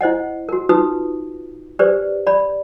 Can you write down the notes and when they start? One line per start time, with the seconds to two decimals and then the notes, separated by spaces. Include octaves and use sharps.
0.01 E4 C5 D#5 F#5
0.49 F#4 A#4
0.69 D#4 F4 F#4 B4 D#6
1.79 G4 B4 C5 D5
2.27 D5 B5